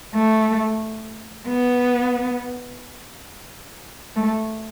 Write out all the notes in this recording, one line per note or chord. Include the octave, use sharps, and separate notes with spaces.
A3
B3
A3